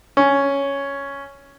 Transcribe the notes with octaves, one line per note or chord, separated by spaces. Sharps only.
C#4